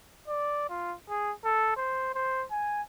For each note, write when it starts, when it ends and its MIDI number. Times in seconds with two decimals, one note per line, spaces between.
0.28 0.65 74
0.69 0.94 65
1.09 1.32 68
1.44 1.72 69
1.77 2.10 72
2.14 2.44 72
2.51 2.82 80